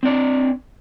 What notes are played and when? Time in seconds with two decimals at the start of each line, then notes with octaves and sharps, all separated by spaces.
0.03 C4
0.05 D5
0.08 D4